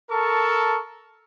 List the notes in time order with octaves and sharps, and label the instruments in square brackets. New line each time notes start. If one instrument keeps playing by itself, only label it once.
[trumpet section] A4 A#4 A5 C#6